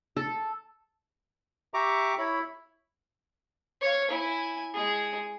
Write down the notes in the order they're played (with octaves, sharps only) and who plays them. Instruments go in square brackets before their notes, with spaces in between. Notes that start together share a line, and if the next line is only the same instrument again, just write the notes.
[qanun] A4
[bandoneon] G4 E5 [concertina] A#5 C#6 D6
[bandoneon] E4 [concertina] C#5 E5 B5
[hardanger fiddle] C#5 F5
E4 G#5
G#3 G#4